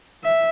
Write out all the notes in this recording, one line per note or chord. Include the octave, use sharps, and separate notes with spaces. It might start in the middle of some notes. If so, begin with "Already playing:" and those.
E5